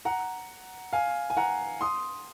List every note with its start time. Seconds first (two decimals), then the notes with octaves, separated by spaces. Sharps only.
0.05 F#5 A#5
0.93 F5 G#5
1.30 G#5
1.37 F#5 A#5
1.81 C6 D#6